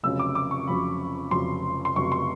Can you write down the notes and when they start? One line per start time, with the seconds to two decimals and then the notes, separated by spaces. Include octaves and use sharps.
0.03 F1 F2 C#3 F#3 E6
0.19 D6
0.35 D6
0.51 C#6
0.68 F1 F2 C#3 F#3 B5
1.31 F1 F2 C#3 F#3 C6
1.85 C6
1.95 F1 F2 C#3 F#3 C#6
2.12 C6